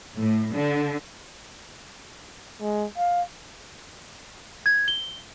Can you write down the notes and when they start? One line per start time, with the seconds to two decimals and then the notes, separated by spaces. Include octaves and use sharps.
0.18 A2
0.55 D3
2.62 G#3
2.98 F5
4.66 G#6
4.88 G7